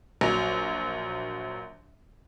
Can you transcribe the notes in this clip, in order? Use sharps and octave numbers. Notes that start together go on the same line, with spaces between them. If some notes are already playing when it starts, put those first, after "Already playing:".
A#1 F#3 F7